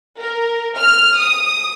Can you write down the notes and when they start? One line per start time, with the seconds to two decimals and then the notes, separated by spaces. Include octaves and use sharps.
0.19 A#4
0.76 F6
1.16 D#6